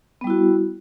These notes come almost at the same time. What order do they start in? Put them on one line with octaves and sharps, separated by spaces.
B3 G3 E4 F#4